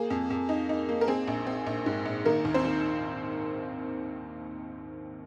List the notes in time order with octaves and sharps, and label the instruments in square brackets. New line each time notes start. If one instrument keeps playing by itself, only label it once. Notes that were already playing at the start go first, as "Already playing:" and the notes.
Already playing: [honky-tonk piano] A#3 G#4
F2
F2
D#4
D#4
A#3
A#4
C4 G#4
A#1
C4
A#1
G#2
A#1
D#3 A#3 A#4
D#2
C4 C5
D#3